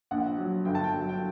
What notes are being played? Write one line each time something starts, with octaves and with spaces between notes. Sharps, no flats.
A#1 F#5
F#3
G1 G5
A5
G5
F#3
G5